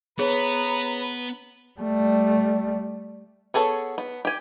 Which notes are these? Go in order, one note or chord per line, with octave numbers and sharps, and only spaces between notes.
B3 G#4 B4 C#5 A#5
G3 A3
B3 G#4 A4 C#5
B3
G4 G#5